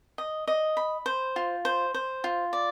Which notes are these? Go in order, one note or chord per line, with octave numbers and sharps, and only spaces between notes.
D#5
D#5
B5
C5
F4
C5
C5
F4
D5